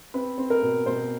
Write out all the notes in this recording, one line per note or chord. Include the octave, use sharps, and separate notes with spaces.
C4 B4
C4
A#4
B2
B2 C5